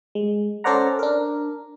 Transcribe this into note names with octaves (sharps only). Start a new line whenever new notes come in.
G#3
C#4 A4 C5 D5 F#5 A#5
D4 A#4